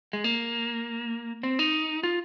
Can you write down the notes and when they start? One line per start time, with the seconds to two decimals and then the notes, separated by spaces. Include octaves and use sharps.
0.13 G#3
0.24 A#3
1.43 C4
1.59 D#4
2.03 F4